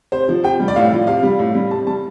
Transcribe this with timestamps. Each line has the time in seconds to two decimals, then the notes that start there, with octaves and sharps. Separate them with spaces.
0.12 C3 C5
0.29 F3
0.44 C3 G5
0.60 G3
0.68 D5
0.76 A2 F5
0.92 F3
1.07 C3 F5
1.23 G3
1.39 A2
1.55 G3
1.71 C3 A5
1.87 G3 A5